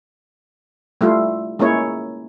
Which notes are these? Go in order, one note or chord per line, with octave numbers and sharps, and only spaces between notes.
G3 A3 E4 F4
G#3 A#3 C#4 E4 C#5